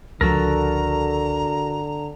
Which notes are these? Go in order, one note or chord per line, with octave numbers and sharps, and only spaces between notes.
C#2 D3 F3 F#4 A4 A#4 A#5